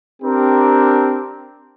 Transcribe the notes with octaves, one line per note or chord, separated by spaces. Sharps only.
C4 D4 G4 A#4